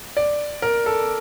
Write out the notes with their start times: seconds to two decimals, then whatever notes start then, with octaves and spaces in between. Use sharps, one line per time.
0.17 D5
0.62 A#4
0.86 A4